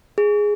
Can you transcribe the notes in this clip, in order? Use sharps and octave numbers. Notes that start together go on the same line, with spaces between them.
G#4